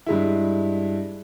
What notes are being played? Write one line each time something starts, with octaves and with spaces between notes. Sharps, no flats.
G2 G#3 E4